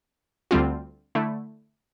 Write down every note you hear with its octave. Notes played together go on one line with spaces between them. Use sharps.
D2 D3 G3 C4 F4
D3 A3 E4